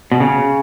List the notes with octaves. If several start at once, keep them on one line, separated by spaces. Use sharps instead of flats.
B2
C#3